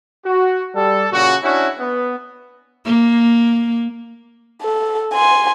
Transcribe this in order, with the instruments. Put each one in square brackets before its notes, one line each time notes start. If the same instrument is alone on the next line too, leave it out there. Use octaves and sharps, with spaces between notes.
[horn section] F#4
G3 A4
A#2 C#3 F#4
C#4 D4 E4 F#4
B3
[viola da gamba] A#3
[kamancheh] A4
G#5 C6